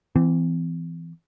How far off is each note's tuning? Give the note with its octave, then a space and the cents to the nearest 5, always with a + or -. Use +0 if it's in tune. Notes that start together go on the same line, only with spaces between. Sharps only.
E3 +15 C4 -40